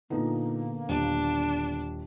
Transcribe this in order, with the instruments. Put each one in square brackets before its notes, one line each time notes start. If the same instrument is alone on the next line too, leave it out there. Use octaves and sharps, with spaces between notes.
[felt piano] A#2 D#4 [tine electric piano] D3 B3 [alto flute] A#3
[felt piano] D#1 [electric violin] D4